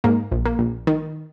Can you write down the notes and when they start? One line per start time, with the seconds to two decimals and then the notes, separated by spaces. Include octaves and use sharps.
0.04 G#2 A#3
0.32 A#1
0.45 A#3
0.59 A#1
0.87 D#3